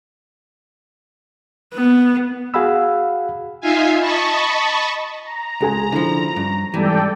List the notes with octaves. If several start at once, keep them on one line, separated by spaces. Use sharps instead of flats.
B3
F#4 G#4 F5 F#5 B5 E6
D#4 F4 E5 F5 G#5
D#5 A5 B5 C#6
A#5
C#2 C#4 G#4 G#5
D3 F3 D4 E4 F4
G2 C#4
G#2 E3 G3 G#3 A4 D5 G5